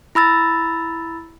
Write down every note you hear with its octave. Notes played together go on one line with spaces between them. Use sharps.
E4 B5 E6 A6